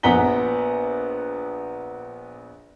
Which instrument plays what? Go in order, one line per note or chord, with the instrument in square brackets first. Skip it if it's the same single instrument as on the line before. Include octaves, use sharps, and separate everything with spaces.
[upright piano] A#1 B3 F#5 A#5 B6 G7